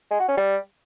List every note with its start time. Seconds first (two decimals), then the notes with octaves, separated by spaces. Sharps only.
0.11 G#3
0.20 F#4
0.28 C#4
0.37 G3